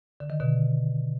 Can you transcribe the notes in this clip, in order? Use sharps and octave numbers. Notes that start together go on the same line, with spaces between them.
D3
D#3
B2 D3